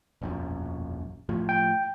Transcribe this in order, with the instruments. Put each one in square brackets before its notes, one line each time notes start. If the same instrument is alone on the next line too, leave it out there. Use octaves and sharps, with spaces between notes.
[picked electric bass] E1 A#1 F#2
A2 F3
[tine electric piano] G5